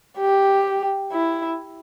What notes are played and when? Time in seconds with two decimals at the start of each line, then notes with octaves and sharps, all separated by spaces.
0.18 G4
1.12 E4